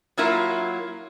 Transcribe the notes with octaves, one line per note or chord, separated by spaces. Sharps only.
F#3 A#3 E4 F4 A#4 E5